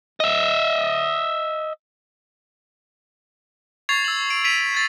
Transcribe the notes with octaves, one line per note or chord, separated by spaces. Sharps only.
D#5 E5
C#6 G#6 A6 C7 F7
E6 F#7
D7
B6 D7 D#7 F7
G#6 A6 C7